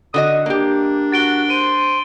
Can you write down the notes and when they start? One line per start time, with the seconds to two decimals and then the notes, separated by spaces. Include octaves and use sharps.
0.14 D3 F#4 D#5 D#6
0.46 A#3 D4 G4
1.12 F#4 A6 D7 G7
1.50 C5 D#7